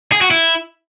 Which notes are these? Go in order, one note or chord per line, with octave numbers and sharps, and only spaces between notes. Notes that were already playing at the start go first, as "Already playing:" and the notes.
G#4
F#4
E4